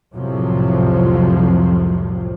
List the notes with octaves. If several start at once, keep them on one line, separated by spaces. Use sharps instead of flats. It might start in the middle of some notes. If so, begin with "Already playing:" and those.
C2 F2 A2 C3 F3 F#3